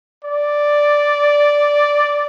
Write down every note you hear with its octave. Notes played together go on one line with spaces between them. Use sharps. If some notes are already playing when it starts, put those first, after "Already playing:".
D5